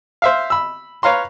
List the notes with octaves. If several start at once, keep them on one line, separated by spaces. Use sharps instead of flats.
C5 E5 F5
B5 E6
B4 C#5 F5 A#5 C6